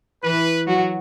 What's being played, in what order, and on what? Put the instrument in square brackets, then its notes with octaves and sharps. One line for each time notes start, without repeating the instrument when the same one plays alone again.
[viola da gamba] E3 E4 [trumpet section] B4
[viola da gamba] F#3 F#4